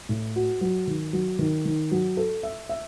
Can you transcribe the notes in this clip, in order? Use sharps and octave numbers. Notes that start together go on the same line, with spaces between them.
A2
F#4
F#3
D#3
F#3
D#3
D#3
F#3
A4
E5
E5